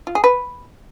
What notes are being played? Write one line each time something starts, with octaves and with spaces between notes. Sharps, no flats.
F4
G#4
B4